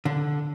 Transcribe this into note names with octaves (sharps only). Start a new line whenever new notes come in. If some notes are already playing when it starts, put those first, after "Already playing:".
D3